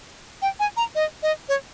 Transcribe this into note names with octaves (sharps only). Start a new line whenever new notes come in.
G5
G#5
A#5
D#5
D#5
C#5